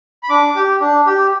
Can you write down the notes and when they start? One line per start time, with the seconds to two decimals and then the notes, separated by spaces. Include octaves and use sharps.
0.23 B5
0.30 D4 D6
0.56 G4
0.81 D4
1.06 G4